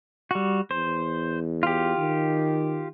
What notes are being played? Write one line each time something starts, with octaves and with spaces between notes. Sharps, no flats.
G3 F#4
E2 C5
F4 G4
D#3